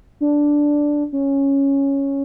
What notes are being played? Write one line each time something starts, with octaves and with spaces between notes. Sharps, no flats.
D4
C#4